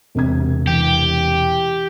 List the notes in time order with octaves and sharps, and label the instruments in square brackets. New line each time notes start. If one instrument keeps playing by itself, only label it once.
[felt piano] E1 C3 G#6
[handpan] E3 [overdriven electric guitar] G4